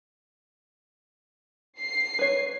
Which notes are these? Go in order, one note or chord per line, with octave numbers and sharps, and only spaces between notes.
C7
B4 C#5